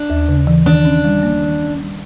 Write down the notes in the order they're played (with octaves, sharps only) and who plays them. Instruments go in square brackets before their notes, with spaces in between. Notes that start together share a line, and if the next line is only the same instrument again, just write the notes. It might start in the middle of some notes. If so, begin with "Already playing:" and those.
Already playing: [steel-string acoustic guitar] D4
[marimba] D#2
C#3
E3
[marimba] D#3 [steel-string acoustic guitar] D4
[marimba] C#4
G3
A#3
D#3
C#4
G3